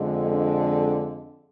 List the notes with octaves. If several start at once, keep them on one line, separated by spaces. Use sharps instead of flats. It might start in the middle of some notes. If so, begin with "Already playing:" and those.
Already playing: F2 D3 G#3
D4